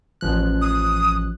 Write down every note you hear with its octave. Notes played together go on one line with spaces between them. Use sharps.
A1 F3 F#6
D#6